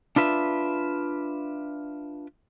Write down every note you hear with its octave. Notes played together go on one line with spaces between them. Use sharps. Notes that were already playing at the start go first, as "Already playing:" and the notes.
D4 F4 B4 E5